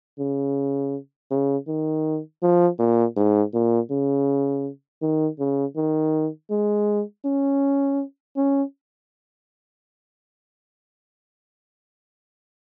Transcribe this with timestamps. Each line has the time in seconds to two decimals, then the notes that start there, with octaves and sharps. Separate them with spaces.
0.19 C#3
1.31 C#3
1.68 D#3
2.42 F3
2.79 A#2
3.17 G#2
3.54 A#2
3.91 C#3
5.02 D#3
5.39 C#3
5.76 D#3
6.51 G#3
7.25 C#4
8.37 C#4